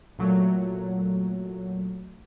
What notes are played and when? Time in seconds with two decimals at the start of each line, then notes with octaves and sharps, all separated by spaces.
0.19 A#2 F#3 A3